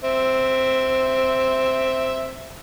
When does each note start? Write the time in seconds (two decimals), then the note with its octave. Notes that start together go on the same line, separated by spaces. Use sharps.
0.04 C4 E5